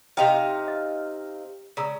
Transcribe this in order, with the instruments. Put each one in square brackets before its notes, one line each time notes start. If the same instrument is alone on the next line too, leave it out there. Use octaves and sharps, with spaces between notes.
[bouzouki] C3 D#4 F5 [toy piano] E4 G5 A#5
[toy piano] D#5
[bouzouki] C#3 [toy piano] D5 A#5 E6